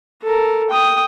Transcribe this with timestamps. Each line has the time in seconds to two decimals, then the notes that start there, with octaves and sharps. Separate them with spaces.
0.23 A4 A#4
0.70 G5 D#6